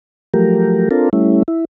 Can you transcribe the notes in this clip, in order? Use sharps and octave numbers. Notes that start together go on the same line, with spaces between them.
F3 F#3 A3 G4 A#4
C4 D4 F4 A4 A#4
G3 A3 C#4 E4
E4